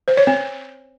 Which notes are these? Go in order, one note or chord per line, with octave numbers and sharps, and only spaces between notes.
C5
C#5
C4